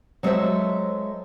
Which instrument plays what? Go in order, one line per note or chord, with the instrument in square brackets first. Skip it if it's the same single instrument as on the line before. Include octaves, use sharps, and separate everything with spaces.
[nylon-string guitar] F#3 G#3 A4 B4 C5 E5